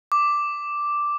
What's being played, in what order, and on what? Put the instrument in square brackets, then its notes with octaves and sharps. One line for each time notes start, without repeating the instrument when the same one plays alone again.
[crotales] D6